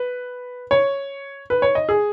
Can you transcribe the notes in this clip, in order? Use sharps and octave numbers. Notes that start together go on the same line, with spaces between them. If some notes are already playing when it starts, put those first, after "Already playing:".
Already playing: B4
C#5
B4
C#5
D#5
G#4